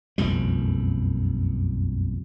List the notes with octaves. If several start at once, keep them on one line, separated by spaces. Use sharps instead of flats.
F#1 B1 F2 G3